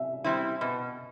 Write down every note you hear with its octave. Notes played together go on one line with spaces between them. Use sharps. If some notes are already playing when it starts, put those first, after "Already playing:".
Already playing: E5
G3 C4 E4
B2